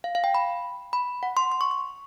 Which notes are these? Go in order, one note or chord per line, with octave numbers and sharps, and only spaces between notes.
F5
F5
G5
B5
B5
F#5
C6
C6
C#6
C#6